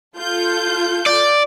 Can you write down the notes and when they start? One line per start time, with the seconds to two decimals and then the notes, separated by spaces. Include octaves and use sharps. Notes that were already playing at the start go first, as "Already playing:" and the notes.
0.18 F4 A4 G6
1.06 D5